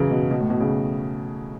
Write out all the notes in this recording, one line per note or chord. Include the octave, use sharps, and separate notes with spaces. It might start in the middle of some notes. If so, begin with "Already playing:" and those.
Already playing: C#3 E3 F#3
B2
B2
A2
B2
C#3